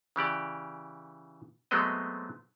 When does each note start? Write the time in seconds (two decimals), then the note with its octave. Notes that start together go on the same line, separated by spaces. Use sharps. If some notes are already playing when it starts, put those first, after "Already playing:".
0.16 C#3 E3 G4 D5
1.71 F#3 G#3 A3 B3 C4 D#5